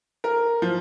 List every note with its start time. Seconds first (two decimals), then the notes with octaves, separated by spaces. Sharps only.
0.24 A#4
0.62 F3